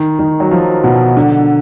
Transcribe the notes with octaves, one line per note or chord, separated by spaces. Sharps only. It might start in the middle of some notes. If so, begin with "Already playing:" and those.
Already playing: D#3
D#3
F#3
F3
B2
D3